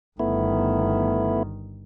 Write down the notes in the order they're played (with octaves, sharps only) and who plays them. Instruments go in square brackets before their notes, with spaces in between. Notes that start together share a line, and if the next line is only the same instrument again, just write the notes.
[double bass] G1 D#3 [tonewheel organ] A3 B3 E4